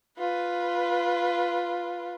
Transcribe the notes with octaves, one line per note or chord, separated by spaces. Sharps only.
F4 B4